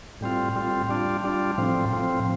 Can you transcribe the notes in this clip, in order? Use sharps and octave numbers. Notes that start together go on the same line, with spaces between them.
A2 G3 C4 F4
A2 G3 C4 F4
G3 D4 F4
G3 D4 F4
A2 F3 C4
A2 F3 C4